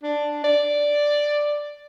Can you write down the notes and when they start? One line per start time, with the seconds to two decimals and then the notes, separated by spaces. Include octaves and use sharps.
0.03 D4
0.44 D5